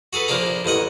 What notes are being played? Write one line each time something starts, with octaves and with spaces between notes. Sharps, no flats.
F#4 G#4 A4 B4
A#1 F3 A#3 D4 G#4 A#5
A1 D#2 D#5 F#5 D#6